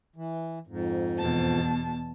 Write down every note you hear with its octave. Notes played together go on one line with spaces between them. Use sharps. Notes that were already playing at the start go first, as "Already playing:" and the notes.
E3
F2 G#2
E2 B2 A5